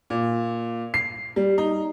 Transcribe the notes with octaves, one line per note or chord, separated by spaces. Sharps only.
A#2
C7
G3
D#4